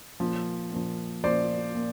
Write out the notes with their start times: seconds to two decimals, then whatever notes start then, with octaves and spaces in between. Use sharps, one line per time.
0.20 A#2 F3
0.71 A#2 F3
1.24 A#2 F3 C5 D5
1.75 A#2